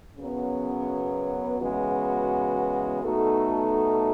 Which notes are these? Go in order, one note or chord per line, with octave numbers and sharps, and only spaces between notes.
F#2 C#3 F#3 B3
C#3 E3 G#3 B3 F#4
B2 A3 D#4 F#4 A4